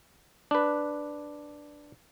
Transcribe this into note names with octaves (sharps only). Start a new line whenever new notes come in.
D4 B4